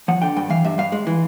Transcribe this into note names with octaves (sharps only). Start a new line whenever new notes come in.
F3 F#5
D3 G5
G2 G5
E3 F5
G2 E5
G2 F5
G#3
E3